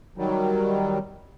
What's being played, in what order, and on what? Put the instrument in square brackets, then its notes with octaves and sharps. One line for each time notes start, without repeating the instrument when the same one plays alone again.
[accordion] D#3 F#3 G3